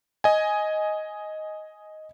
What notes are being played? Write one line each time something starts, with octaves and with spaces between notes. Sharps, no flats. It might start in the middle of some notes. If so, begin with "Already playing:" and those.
D#5 G#5